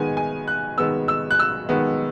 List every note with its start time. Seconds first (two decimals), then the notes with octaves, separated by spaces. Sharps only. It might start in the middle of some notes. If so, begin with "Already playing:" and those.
Already playing: D#3 G#3 B3 G#5
0.17 G#5
0.48 F#6
0.78 D#3 G#3 B3 E6
1.08 E6
1.31 F#6
1.39 E6
1.69 D#3 G#3 B3